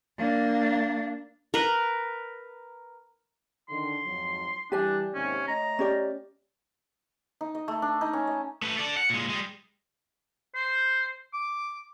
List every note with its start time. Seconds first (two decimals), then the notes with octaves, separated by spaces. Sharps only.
0.18 A#3 D4
1.54 A#4 B4
3.69 D3 D#3 C6
4.05 F2 G#2 F#3
4.72 E3 G3 D4 G4 D5 G#5
5.14 D#2 G#2 C3 C#4
5.48 A3 C#5 D#5 A#5
5.79 C#4 G4 D5
7.41 D#4
7.55 D#5
7.68 A3
7.82 D4
8.01 D#4
8.13 C#4
8.27 D#5
8.62 A3 B4
8.77 A4 D5
8.97 F#5
9.10 A#2 G#3
9.30 G3 G#3
10.55 C5
11.34 D6